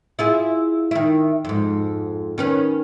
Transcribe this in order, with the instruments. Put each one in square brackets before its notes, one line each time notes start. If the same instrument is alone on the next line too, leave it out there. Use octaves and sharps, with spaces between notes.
[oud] E4 F4 G#4
D#3 E4
F2 G#2
D#3 C#4 B4